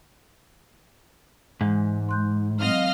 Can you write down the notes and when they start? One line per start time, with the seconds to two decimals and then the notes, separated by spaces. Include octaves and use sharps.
1.61 G#2 E3 G#3
2.09 C6 F#6 G6
2.61 F#3 C4 D#5 F5 F6